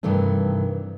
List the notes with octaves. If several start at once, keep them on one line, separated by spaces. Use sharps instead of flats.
G2 C3 D#3 E3 A3 D4